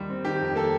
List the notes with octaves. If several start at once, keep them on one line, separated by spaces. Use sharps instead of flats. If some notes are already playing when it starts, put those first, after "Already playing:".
Already playing: D#2 D#3 G3
C4
D#3 G4
F2
A#3 A4